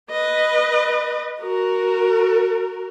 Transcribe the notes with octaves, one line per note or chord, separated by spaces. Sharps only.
B4 D#5
F#4 A#4